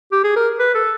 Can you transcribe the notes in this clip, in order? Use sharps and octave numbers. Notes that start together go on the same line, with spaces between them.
G4
G#4
A#4
B4
A4